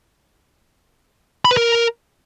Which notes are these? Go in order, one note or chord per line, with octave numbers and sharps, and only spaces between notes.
B5
B4
A#4